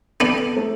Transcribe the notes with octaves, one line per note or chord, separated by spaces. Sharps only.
B3 D4 A4
A3